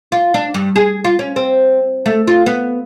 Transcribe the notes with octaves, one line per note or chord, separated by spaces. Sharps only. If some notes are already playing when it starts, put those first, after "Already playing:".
F4
D4
G2
G#4
F4
C#4
C4
A3
F4
B3